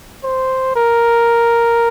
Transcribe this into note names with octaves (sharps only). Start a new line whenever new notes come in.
C5
A#4